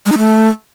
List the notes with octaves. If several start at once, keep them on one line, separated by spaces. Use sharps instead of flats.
G#3
D#4
A3